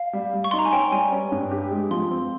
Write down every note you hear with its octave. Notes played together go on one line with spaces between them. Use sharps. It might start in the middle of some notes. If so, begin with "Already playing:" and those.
Already playing: F5
G3
G3
C#6
D#4 C6
A#5
G#5
C#4 G5
G3 G#5
C#4
G2
G4
G#3
F3 C6
C4